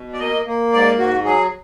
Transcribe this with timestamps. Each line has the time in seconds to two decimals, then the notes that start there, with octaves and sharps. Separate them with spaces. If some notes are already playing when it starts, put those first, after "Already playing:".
Already playing: B2
0.13 D5
0.19 A#3 D#5
0.46 A#3
0.72 G#2 D5
0.99 G#2 F#4
1.25 F#3 G#4